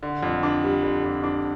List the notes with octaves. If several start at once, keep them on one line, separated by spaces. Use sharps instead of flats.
D3
F2
D4
G3
D3
F2
D4